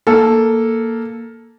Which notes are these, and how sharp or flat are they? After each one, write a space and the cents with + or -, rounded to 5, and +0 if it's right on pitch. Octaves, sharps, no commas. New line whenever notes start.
A#3 +0 A4 +0